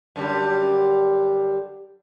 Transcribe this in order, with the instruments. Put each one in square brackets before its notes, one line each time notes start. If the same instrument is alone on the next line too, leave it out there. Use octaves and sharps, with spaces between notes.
[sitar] F#2 D3 G3